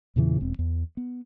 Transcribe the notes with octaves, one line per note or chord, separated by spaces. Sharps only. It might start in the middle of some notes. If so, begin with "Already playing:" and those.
E2 A#2 C#3 E3
E1 C4
E2
B3